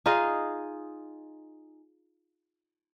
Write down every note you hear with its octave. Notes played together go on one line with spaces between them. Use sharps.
D#4 F4 G#4 D#5